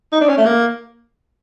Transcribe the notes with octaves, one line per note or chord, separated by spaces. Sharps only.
D#4
D4
C#4
A3
A#3